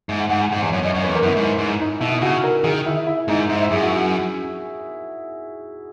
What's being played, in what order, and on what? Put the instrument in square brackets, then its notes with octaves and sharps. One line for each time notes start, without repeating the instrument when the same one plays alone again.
[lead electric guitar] G#2 [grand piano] E5
[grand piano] F#5
[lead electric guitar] G#2 [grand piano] F#5
[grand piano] G#5
[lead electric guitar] G#2 [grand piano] F#5
[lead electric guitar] E2 [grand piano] E5
[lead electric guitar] F#2 [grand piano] C#5
[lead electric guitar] F#2 [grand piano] D#5
[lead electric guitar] F#2 [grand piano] C#5
[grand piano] B4
[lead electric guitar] E2
[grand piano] A#4
[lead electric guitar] F#2 [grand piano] E4
[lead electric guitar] G#2
G#2
[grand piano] D#4
[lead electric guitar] B2 [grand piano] E4
[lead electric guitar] C#3 [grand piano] F#4
[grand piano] A#4
[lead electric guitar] D#3 [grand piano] G#4
[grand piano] E4
E4
[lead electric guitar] G#2 [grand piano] D#4
[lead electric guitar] G#2 [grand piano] E4
[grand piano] E4
[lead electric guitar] F#2 [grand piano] G#4
[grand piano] F#4
F#4